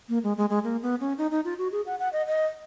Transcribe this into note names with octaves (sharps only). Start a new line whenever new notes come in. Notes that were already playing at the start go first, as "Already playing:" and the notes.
A#3
G#3
G#3
G#3
A#3
B3
C#4
D#4
D#4
F4
F#4
G#4
F#5
F#5
D#5
D#5